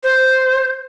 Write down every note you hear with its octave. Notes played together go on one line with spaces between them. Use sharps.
C5